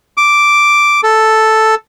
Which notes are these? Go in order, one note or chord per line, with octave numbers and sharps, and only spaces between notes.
D6
A4